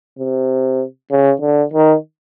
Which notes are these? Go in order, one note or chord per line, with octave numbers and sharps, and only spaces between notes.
C3
C#3
D3
D#3